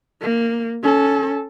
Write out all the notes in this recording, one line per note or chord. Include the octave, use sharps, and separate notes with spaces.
A#3
C#4 A4